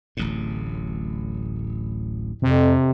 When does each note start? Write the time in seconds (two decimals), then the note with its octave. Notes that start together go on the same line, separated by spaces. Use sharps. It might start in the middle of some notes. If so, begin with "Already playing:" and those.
0.17 D1 A1 A2
2.42 F2 C3